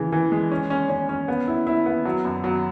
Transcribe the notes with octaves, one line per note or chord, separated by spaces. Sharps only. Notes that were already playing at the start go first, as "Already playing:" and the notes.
Already playing: C#3 E3
E3
G#3
C#4
C#4
C#4
C#4
B3
E4
E4
B3
F#3
F#2
F#3